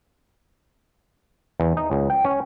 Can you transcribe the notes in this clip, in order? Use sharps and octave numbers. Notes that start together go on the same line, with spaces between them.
E2
D#4
C#2
G5
C#4